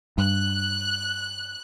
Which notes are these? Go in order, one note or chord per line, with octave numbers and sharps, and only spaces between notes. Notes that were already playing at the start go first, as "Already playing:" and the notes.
G2 F#6